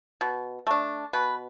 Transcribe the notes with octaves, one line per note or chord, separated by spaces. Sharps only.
B2
A3 D4
B2 B4